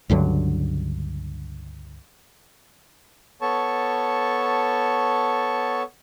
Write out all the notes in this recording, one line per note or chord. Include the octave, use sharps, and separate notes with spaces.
C#2 G2 D3 F#3
B3 A4 C#5 A5 C#6